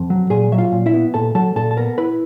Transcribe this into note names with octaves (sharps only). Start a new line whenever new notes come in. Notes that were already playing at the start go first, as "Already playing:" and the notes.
Already playing: F2
F#3
A#2 G#4 G#5
F#3 E5
F4 F5
A#2
E4 E5
B3
A#2 A4 A5
F#3 A4 A5
A#2 A4 A5
A5
B3 A#4 A#5
E4 B4 B5